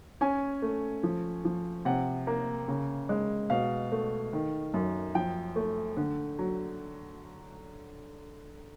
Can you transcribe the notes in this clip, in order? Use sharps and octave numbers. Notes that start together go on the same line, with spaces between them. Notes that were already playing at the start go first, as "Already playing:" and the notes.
C#4 G#5
A3
F3
F3
C3 F#5
A#3
C#3
G#3
B2 F5
A3
D#3
F#2
F3 G5
A3
D3
F#3